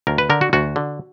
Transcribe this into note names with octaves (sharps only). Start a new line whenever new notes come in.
D2 A#4
B4
D3 A#4
F#4
D2 F#4
D3